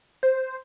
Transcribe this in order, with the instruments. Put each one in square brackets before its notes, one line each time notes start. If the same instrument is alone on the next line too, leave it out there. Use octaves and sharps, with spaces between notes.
[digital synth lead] C5